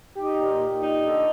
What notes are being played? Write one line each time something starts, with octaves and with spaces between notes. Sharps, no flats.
D#4 G4
A#2
A#2
D#4
D3